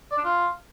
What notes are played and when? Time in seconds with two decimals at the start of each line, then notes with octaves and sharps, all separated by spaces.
0.11 D5
0.18 D4
0.24 F4